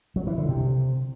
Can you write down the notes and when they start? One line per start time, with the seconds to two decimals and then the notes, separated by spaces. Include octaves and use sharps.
0.16 F#3
0.27 E3
0.38 D3
0.49 C3